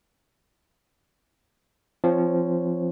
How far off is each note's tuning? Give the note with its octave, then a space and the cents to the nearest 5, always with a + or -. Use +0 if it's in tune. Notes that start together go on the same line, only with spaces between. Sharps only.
F3 -15 C4 +0 C#5 +0